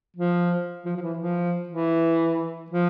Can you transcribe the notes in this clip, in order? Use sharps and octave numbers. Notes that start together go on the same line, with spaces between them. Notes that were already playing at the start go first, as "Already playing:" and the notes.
F3
F3
F3
E3
F3
E3
F3